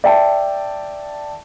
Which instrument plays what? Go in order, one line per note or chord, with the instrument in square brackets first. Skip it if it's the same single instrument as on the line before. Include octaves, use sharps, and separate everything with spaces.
[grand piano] D5 E5 G5 A5